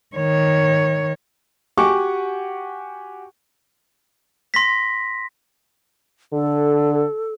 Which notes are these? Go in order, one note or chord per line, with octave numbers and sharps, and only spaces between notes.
D#3 C#5
F#4 G4 F#5 G#5 C#6 D6
C6 A#6 B6
D3 A4